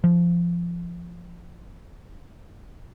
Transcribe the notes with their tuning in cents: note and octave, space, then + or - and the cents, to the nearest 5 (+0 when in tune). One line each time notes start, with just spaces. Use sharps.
F3 -15